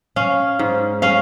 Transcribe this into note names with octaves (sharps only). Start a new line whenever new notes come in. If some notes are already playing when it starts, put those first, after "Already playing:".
C#4 F5
G#2
C#4 F5